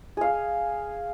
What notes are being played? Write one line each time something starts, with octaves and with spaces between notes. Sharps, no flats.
G#4 F5